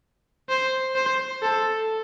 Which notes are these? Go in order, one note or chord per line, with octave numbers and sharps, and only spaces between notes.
C5
C5
A4